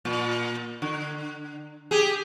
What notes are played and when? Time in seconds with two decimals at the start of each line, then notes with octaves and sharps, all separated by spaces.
0.05 A#2
0.82 D3
1.91 G4 G#4